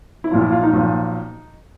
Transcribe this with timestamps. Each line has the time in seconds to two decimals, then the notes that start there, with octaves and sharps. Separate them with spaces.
0.24 E4
0.31 B1 A#2 F3 F4
0.42 E4
0.52 F4
0.63 D#4
0.73 B1 A#2 F3